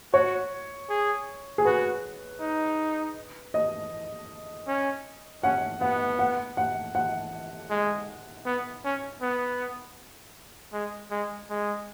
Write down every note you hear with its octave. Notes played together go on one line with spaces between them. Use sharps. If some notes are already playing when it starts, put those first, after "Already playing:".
F#4 C#5
G#4
G#4
F#4 B4
D#4
D#5
C#4
C#4 F#5
B3 F#5
F#5
F#5
F#5
G#3
B3
C#4
B3
G#3
G#3
G#3